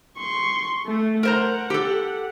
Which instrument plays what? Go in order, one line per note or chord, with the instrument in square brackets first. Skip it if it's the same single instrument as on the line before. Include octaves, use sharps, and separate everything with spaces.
[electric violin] C6 C#6
A3
[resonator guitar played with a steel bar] A#4 C5 A#5 [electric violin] F#5
[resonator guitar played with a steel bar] G4 A4